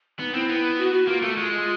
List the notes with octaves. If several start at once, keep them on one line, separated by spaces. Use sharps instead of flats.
B3 D#4
C4 E4
B3
F#4
F#4
A#3 F4
A3
G#3